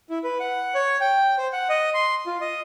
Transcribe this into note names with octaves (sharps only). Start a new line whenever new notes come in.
E4
B4
F#5
C#5
G5
C5
F#5
D#5
C6
F4
D#5